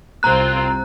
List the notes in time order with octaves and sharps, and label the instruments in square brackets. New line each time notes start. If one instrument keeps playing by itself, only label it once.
[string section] C2 C4 F4 [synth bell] A#5 F#6